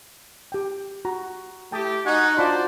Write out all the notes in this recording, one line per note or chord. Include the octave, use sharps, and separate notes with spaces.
G4 G5
F#4 A#5
A3 E4 G4 G5 A5 D#6
D#4 F#4 F#5 G#5
D4 F4 F#4 C5 D5 B5 C6